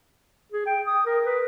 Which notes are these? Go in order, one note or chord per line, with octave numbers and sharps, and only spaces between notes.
G#4
G5
D#6
A#4
B4